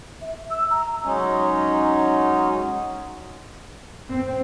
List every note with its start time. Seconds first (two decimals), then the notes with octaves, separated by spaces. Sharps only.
0.21 E5
0.50 E6
0.71 A#5
1.04 F#3 G#3 C#4 D#4
4.08 C4